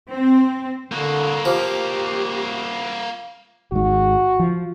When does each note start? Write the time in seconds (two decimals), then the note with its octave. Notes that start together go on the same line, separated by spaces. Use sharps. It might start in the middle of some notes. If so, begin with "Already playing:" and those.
0.10 C4
0.92 D3 A#3 F#4
1.45 F3 G4
3.72 G#1 G#2 F#4
4.39 F3